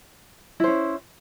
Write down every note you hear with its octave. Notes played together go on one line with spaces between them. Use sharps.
C#4 E4 C5